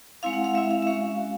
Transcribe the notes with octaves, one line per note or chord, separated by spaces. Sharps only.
G#3 C4 E4 F5
F#5
F5
G#3 C4 E4 E5
F5
E5
G#3 C#4 F#4 F5
G#3 C#4 F#4